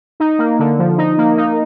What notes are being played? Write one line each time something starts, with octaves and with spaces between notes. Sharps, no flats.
D#4
A#3
D3
F3
D#4
A#3
D#4